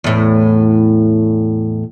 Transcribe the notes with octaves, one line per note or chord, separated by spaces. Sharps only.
E2 A2